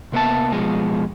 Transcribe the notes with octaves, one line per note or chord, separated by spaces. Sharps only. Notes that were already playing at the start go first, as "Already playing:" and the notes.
C3 A#3 B3 E5 A5
B2 F3 G#3